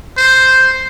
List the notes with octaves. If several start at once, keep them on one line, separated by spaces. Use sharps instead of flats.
C5